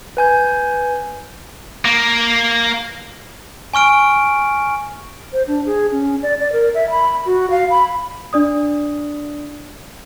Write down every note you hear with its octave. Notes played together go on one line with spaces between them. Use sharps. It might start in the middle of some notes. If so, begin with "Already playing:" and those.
B4 G#5 G6
A#3
G#5 C#6 F6 D7
C5
D4
G#4
C#4
D5
D5
A#4
E5
B5
F#4
F5
B5
D4 D5 D#6